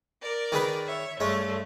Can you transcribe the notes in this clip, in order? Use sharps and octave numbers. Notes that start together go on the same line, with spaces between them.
A#4 D5
D#3 G#4 B4
C#5 E5
G2 G#3 A3 C#4